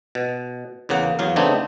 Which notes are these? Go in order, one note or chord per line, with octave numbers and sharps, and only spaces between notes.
B2
E2 C#3 A#3 F#5
E2 F#3 F5
C#3 A3 B3 C4 D4 D#4